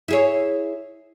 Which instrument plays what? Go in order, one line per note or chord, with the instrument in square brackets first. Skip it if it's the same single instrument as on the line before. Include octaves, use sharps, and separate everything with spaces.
[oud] E4 G#4 C#5